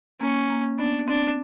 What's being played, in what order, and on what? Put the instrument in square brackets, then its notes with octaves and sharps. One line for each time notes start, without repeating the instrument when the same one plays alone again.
[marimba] A#3 [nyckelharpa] C#4
[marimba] A#3
[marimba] B3 [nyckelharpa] D4
[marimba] C4 [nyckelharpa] D4